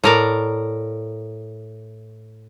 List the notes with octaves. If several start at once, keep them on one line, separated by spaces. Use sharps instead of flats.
A2 A#4 D5